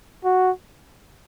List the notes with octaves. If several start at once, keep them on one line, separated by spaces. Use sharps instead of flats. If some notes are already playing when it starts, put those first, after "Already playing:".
F#4